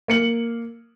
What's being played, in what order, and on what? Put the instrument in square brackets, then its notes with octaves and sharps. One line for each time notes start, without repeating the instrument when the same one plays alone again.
[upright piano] A#3 C#7 F#7